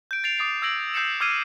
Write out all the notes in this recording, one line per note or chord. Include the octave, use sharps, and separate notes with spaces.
G6 D7
G6 A6 C7 D7 F7
D6 D#6 A6 C7
E6 G#6 A#6 D7 F#7
E6 G6 C7 C#7 E7
D6 E6 F6 G#6 C7 D#7